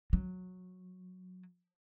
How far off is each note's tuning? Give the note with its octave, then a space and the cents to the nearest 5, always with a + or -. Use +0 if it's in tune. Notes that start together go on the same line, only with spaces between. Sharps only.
F#3 -15